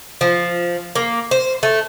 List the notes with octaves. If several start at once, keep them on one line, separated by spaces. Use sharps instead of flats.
F3
A#3
C5
A3